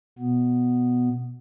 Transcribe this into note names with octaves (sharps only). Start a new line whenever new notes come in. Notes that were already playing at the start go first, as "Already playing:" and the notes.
B2 B3